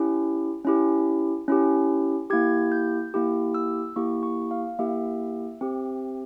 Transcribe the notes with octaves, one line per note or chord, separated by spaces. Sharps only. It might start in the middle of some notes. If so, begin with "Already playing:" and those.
Already playing: C#4 E4 G4
C#4 E4 G4
C#4 E4 G4
A#3 E4 G4 G#6
G6
A#3 E4 G4
E6
A#3 E4 G4 C#6
C#6
F5
A#3 E4 G4 E5
C4 G4